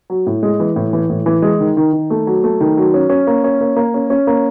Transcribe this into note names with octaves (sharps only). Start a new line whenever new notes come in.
F#3
A2
G#3
E3
A2
E3
A2
E3
G#3
D#3
D#3
D#3
A3
F#3
A3
D#3
F#3
C#4
C#4
A#3
C#4
A#3
A#3
C#4
C#4
A#3